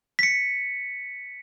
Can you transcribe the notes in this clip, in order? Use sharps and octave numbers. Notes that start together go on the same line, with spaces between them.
B6 C#7